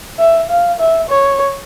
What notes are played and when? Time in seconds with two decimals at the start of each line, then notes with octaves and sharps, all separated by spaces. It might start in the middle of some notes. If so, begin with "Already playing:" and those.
0.19 E5
0.49 F5
0.79 E5
1.09 C#5